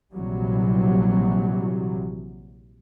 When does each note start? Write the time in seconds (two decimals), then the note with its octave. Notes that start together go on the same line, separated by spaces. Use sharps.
0.13 A#1 C3 E3 F#3 G3